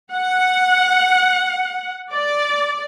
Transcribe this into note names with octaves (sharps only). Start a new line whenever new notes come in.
F#5
D5